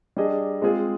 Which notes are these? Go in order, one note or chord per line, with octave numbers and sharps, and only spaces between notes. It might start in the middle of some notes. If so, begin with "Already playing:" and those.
G3 D4 G#4 D#5
G#3 C4 F4 G#4